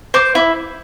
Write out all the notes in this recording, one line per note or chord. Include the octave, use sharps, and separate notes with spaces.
C5 D6
E4